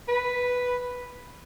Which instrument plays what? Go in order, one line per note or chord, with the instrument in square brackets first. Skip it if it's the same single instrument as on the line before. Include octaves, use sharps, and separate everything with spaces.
[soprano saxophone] B4